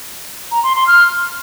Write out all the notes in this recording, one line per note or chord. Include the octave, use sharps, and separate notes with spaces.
A#5
C6
C6
F6